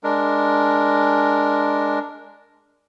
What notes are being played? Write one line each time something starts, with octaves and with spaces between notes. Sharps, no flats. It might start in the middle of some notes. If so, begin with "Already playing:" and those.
G#3 D4 A#4